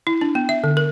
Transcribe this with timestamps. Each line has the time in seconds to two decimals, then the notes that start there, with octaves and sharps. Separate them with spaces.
0.07 E4
0.21 D4
0.35 B3
0.49 E5
0.64 D3
0.77 A#4